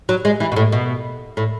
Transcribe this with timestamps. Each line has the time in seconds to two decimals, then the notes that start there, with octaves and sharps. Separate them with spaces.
0.09 F#3
0.25 G#3
0.40 E3
0.52 B2
0.56 A2
0.72 B2
1.37 A2